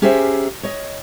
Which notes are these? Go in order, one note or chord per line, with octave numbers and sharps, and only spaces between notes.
C#4 G4 G#4 A#4 C5 E5
C#5 D#5